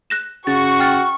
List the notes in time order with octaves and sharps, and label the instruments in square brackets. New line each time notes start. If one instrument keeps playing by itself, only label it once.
[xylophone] F#6 A#6 E7
[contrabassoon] C#3 [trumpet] F#4 [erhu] C#6 [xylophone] A6
[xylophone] G5 F6 A6